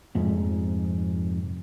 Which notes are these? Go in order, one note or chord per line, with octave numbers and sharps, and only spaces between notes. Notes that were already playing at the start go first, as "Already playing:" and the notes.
F1 F2 G#2